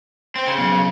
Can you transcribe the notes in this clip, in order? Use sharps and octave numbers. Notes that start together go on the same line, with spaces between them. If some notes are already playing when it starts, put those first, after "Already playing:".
C4 C5 C6
C#3
F#3 B3